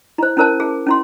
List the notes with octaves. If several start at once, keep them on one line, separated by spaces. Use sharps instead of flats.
E4 C5
C#4 E4 A#4 C5 A5
G#4
C#4 E4 C6